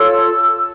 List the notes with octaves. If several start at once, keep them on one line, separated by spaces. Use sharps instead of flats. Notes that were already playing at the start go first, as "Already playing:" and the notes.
Already playing: F4 A4 C#5 E6